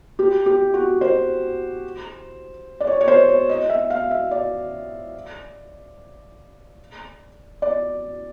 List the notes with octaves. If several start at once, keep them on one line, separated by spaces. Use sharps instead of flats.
G4
G4
F#4
C5
D5
C#5
C#5
C5
C#5
D#5
E5
F5
E5
D5
D5